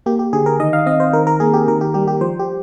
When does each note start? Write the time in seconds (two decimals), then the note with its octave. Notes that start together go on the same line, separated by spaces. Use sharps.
0.06 A#3 G4
0.19 G4
0.33 D3 G#4
0.46 A#4
0.60 D#3 D#5
0.73 F5
0.86 C4 D#5
1.00 C5
1.13 D#3 A#4
1.27 A#4
1.40 A#3 G#4
1.53 G4
1.68 D#3 A#4
1.81 G4
1.94 G3 G4
2.08 G4
2.21 F3 C5
2.39 G4